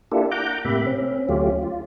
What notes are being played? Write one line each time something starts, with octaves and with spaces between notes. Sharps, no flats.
A#3 D4 E4 F4 G4 A4
F#5 A#5 D6 G6
A2 C3 A#3 G4 E5 B5
C4 C#4
D2 F#3 A3 C#4 F4 G4
F4